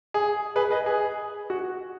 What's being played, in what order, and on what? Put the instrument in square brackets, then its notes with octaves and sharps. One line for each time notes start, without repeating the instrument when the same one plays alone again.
[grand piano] G#4
G#4 B4
B4 D#5
G#4
F#4